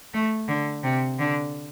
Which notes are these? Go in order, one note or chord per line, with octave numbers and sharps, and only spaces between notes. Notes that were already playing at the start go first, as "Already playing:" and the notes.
A3
D3
C3
D3